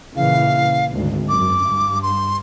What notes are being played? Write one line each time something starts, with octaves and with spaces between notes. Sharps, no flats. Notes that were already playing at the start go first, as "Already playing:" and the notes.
A#2 C#3 E3 F5
G#1 D2
F#2 D6
G2
C6